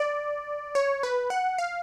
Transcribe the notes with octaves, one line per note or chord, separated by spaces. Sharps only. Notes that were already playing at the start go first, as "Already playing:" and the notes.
Already playing: D5
C#5
B4
F#5
F5